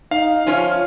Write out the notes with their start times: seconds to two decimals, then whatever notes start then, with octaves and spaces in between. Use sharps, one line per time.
0.11 D#4 F5
0.47 F3 C#4 F4 C#5